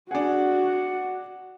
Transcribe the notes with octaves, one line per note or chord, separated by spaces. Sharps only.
D4 F#4 G#4 F#5